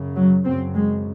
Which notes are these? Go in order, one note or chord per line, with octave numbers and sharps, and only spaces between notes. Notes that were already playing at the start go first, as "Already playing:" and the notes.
Already playing: F#2 C#3
F#3
F#2 C#3 C4
G#3